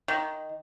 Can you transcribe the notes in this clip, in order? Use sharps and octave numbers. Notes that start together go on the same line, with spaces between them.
D#3